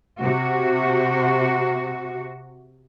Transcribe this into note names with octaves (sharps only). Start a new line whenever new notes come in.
C3 F#4